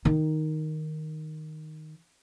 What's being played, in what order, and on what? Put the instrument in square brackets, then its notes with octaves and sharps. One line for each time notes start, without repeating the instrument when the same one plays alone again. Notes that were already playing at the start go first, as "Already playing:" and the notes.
[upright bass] D#3 D#4